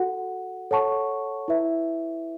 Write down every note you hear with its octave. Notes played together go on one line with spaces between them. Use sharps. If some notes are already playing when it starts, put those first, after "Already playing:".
Already playing: F#4 A4 F#5
A4 C#5 F#5 A5 C#6
E4 B4 E5